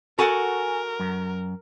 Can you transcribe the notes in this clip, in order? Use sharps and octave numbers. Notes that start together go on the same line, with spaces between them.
F#4 A4 A#4 F#5 G#5
F#2